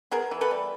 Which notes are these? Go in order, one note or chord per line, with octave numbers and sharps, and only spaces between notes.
B3 G#4 A#4
E3
A4 B4
G3